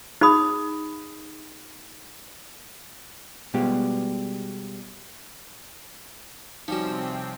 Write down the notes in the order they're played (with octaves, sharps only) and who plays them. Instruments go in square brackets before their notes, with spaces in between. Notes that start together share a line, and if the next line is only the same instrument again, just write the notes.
[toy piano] D#4 G#4 B5 D#6
[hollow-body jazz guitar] B2 G3 G#3 B3 F4 G4
[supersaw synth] C3 C4 [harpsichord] F3 G3 C#4 [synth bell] D#4 F#4